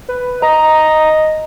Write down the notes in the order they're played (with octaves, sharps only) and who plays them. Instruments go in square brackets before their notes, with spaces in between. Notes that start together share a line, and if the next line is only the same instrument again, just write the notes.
[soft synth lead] B4
[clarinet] D#5 [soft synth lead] A#5